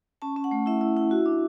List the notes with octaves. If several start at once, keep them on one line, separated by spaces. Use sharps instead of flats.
C#4 A5
C#4
F#5
A3
E4 E5
E4
E4
F#4
D4